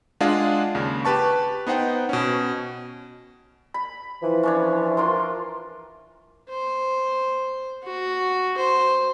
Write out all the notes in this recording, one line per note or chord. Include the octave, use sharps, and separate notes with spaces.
G#3 D4 F4 G#4 F5 F#5
D#2 C#3
G4 B4 A5 C#6
B3 D#4 C5 F#5 G5
B2 C#4
B5
E3 F3
C#4 D4 C#5
F4 A#4 C6
C5
F#4
C5